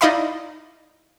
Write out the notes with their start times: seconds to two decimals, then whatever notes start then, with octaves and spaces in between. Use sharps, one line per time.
0.01 D#4 E4 D5 D#5 F5 B5